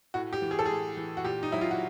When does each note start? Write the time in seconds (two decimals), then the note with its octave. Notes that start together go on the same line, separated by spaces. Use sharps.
0.14 A2 F#4
0.33 G4
0.42 E3
0.51 G#4
0.59 A4
0.65 A2 G#4
0.97 E3
1.17 F#4
1.25 A#2 G4
1.43 D#4
1.52 F#3 E4
1.61 F4
1.71 F#4